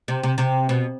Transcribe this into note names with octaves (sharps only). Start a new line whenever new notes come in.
C3
C3
C3
B2